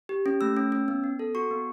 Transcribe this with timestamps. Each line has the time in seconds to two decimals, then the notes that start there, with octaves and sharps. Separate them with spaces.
0.09 G4
0.26 C#4
0.41 A3 E6
0.57 C#4
0.72 C#4
0.88 B3
1.04 B3
1.19 A4
1.35 F#4 C#6
1.51 B3